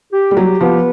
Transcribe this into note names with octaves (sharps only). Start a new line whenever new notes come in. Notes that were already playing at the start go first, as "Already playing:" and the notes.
G4
G3
F#3 G4
F3 B3